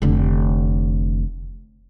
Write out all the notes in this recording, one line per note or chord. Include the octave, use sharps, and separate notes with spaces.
F1 D3